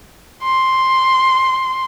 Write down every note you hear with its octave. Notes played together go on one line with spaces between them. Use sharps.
C6